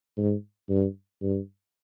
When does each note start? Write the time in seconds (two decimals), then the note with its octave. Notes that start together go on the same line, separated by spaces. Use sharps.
0.17 G#2
0.69 G2
1.22 G2